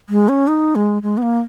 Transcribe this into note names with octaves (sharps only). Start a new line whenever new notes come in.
G#3
C#4
D#4
G#3
G#3
B3
A#3